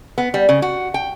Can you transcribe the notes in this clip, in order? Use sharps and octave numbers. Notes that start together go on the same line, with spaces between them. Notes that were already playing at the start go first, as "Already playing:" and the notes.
B3
G3
C#3
F#4
G5